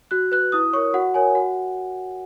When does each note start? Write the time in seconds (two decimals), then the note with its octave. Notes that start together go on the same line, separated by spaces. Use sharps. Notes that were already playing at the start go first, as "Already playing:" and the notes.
0.11 F#4 F#6
0.32 B4 F#6
0.52 E4 D#6
0.73 A#4 C#5 C#6
0.94 F#4 F#5
1.14 A#4 C#5 G#5
1.35 F#4 F#5